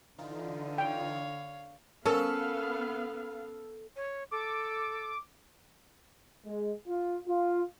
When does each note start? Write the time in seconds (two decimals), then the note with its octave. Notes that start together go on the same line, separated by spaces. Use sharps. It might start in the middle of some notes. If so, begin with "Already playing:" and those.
0.18 D3 E3 D#4 F4
0.78 C#5 F5 G5
2.06 B3 C#4 A4 A#4 F5 A5
3.96 C#5
4.31 A4 D6
6.46 G#3
6.88 F4
7.27 F4